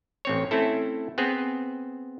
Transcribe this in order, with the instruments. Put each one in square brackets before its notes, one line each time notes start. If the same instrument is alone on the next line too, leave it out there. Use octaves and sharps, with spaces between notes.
[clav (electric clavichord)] A1 C4 C#5
A3 C4 C#4 E4 A4
B3 C4 G#4